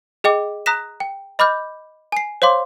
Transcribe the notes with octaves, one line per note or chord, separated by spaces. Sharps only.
G#4 D#5 G5 D6
A#5 D#6 F#6 A#6 B6 E7
G5
D#5 B5 D6 F6 G6
G#5 C7
C5 C#5 F5 C6 D6